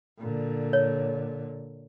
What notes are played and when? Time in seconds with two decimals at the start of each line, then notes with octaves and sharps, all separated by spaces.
0.19 A#2 D3
0.73 C#5